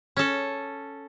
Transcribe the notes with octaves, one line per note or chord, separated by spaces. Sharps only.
C#4 A4